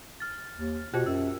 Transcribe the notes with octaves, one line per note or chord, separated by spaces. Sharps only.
F6 A6
D#2
B2 F4 G4 C5
F#2 E6